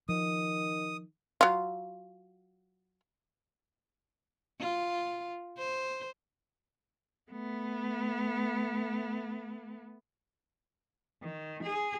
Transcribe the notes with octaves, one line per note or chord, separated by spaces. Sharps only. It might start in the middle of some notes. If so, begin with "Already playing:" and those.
D#3 F3 D#6
F#3 F4
F4
C5
A3 B3
D#3
G#4